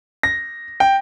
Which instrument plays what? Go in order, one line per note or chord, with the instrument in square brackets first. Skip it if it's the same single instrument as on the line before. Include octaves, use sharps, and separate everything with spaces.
[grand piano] A#6
G5